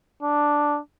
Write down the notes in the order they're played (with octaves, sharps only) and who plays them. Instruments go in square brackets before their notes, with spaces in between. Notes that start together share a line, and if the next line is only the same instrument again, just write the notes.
[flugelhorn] D4